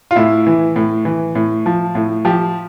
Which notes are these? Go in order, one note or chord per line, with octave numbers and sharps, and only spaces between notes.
F4
A2 E4
E3
A2
E3
A2
F3
A2
F3 G4